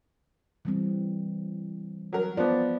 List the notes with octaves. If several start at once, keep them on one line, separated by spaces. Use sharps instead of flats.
E3 G3 C4
F#3 A#4
F3 B3 D5